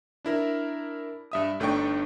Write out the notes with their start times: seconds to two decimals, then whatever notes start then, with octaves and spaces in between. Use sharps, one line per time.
0.25 D4 E4 A#4
1.32 G2 E5 D#6
1.60 G1 A3 D4 D#4 G5 C#6